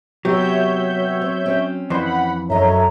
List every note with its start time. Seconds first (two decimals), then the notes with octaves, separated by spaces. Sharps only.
0.25 C3 F#3 B3 G4 C#5 E5 G6
1.22 C4
1.46 C4 C#4
1.90 F2 E3 C5 F#5 B5
2.50 F#2 A4 C#5 D#5 E5 A#5